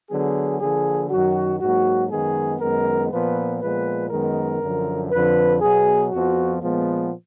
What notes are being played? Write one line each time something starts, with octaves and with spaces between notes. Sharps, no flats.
D3 F#3 B3 G#4
D3 F3 A#3 G#4
F#2 D#3 F#3 F#4
G#2 F#3 A#3 F#4
F#2 D#3 G#3 B3 G#4
F#2 D#3 G#3 B3 A#4
A#2 F3 B3 B4
A#2 F3 G#3 B3 B4
F#2 D#3 G#3 B3 A#4
F#2 D3 F3
F2 D3 F3 B4
B2 F#3 B3 G#4
F2 F3 B3 F#4
A#2 F3 G#3 B3